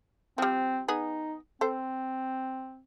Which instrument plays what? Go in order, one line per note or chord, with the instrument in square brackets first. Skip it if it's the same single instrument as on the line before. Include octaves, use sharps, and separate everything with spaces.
[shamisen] F3 G3 [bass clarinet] C4
[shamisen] B3 G#4 [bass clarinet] D#4
[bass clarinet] C4 [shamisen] A4 C5